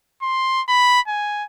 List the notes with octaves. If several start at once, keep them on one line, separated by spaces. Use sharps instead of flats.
C6
B5
G#5